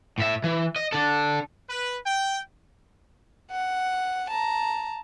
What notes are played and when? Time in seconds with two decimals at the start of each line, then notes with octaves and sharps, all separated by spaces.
0.18 A2 E5
0.44 E3
0.76 D#5
0.92 D4 A4
1.68 B4
2.04 G5
3.50 F#5
4.30 A5 A#5